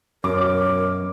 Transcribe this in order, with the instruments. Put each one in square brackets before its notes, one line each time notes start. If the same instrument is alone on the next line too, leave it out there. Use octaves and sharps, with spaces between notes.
[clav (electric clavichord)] F#2 [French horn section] B2 C#5 [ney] A#4 [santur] D6